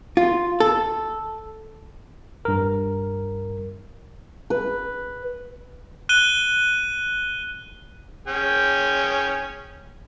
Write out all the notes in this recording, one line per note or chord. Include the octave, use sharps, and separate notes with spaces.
F4
A4
G2 A#4
B4
F#6 D#7 G7
C#4 G#4 G5